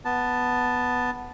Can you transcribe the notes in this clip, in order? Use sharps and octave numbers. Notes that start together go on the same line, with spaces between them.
B3 A5